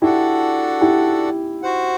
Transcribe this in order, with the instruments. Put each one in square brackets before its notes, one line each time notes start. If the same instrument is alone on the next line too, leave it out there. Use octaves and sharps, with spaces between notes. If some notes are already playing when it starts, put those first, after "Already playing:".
[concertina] D4 F#4 A4 D5 F#5 [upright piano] E4 G4
[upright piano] E4 G4
[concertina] F#4 C5 F#5